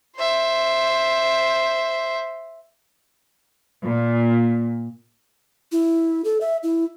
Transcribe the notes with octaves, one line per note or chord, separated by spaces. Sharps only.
C5 E5
A#2
E4
A4
E5
E4